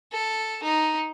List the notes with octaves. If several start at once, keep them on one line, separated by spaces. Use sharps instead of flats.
A4
D#4